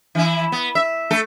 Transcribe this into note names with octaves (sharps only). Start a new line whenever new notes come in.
E3 E4
B3
E5
A3 A4